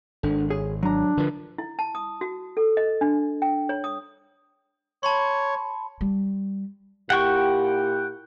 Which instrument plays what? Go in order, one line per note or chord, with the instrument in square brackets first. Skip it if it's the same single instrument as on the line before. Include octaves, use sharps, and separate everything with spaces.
[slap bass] G#1 [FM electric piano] D4 A4
[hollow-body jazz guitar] G#4 [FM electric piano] C#5
[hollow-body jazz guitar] F#3 A#5 [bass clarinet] D4
[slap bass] D3 F3 [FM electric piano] A#4 B4
[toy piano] E4
A5
D#6
F#4
A4
D#5
D4
G5
C#5
D#6
[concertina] C#5 [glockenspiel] A5 B5 C6
[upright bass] G3
[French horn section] A#2 E4 G4 [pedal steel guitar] F#5 G5 C#6